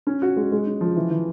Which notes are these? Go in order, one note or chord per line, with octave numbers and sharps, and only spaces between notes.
C#4
F#4
G#3
G#3
C#4
F3
E3
E3